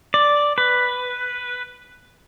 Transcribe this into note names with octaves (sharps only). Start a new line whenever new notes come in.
D5
B4